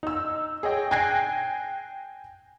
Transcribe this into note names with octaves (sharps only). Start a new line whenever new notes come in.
D#4 E6
G#4 C#5 D#5 G5
G5 G#5 F#6 G#6 A#6 C7